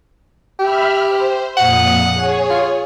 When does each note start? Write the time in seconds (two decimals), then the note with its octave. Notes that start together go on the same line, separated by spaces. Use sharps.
0.59 G4 E5 B5 F6
1.08 C5
1.57 F2 A#2 F#5 D#6
2.14 G#4 C#5
2.50 F4